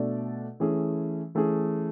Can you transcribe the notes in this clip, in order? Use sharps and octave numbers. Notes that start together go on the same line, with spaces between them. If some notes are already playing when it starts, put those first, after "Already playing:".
Already playing: B2 A3 D4 A4 D5
E3 A3 C#4 G#4
E3 A3 C#4 G#4